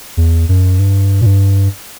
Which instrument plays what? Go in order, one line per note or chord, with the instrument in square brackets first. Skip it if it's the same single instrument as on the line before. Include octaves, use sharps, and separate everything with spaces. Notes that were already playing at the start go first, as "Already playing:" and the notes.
[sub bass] E2
F#2
G2
A#2
G2